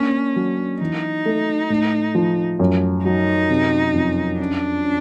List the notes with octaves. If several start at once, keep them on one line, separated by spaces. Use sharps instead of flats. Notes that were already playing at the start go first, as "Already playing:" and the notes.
Already playing: A#3 C#4 D4
F#3
E3 D#4
A3
A2
F3
F#2
F#3 D#4
C3
F2
C#4 D4
C#4